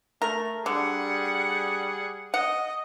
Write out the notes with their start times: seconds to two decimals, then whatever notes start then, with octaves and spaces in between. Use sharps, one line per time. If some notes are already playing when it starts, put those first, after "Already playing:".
0.22 A3 A#4
0.66 D3 G3 G#4 F#5
2.34 D#5 F#5